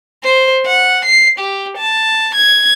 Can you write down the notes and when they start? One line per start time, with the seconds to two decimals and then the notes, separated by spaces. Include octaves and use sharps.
0.23 C5
0.66 F#5
1.05 C7
1.39 G4
1.78 A5
2.35 G#6